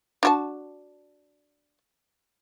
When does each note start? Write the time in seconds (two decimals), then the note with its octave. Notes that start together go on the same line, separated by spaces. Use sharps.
0.23 D4 F#4 A5